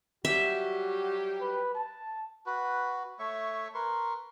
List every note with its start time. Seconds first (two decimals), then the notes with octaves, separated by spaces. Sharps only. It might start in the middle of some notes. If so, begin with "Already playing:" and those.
0.25 F#3 G3 F#4 G4 E5
1.41 B4
1.75 A5
2.46 F#4 B4
3.19 A3 C#5 E5 C#6
3.74 A#4 B4 C6 C#6